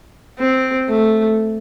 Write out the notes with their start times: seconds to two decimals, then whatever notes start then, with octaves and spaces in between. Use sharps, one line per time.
0.39 C4
0.89 A3